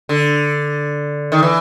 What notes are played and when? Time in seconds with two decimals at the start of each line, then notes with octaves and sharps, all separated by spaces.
0.09 D3
1.32 D#3
1.42 E3